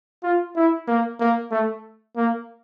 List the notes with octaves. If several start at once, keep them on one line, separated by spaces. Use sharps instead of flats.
F4
E4
A#3
A#3
A3
A#3